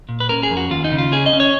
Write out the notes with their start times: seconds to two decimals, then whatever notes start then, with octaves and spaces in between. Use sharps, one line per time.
0.09 A#2
0.20 B4
0.29 C#4 A#4
0.43 G#4
0.51 F2
0.57 F#4
0.71 D#2 F4
0.84 D#4
0.92 C#3
0.98 F4
1.12 C#4 G#4
1.26 D#5
1.33 C#4
1.40 C#5